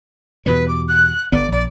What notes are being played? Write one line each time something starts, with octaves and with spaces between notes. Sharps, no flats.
E2 B2 G3 B4
D6
F#6
G1 B3 D5
A#1 D5